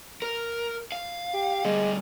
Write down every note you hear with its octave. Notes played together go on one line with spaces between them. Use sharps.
A#4
F5
G4
D2 G3 G#3